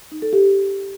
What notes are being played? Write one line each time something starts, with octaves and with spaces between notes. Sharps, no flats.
D#4
A4
G4